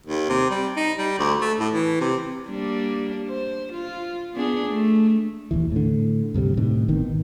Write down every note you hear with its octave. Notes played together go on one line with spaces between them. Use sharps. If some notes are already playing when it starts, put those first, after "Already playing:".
D#2
C3
G3
D#4
G3
D2
A3
A2
E3
C3
G3 A#3 D4
C5
F4
B3 D4 G#4
A3
D#1 D#2 E3
A2 D3
D2 G2 C3 G3
A2 C3 D#3
G#1 B2 D#3